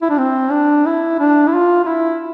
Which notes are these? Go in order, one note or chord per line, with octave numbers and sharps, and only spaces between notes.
E4
D4
C4
D4
E4
D4
E4
F4
F4
E4